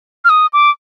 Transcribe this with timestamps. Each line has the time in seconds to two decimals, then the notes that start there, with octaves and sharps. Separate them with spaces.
0.25 F6
0.29 D#6
0.53 D6